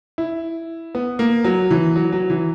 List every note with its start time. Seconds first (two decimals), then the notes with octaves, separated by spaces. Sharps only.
0.18 E4
0.95 B3
1.19 A#3
1.44 F#3
1.71 E3
1.96 F#3
2.13 F#3
2.30 E3